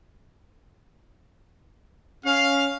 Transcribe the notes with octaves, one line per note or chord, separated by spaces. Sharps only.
C#4 F5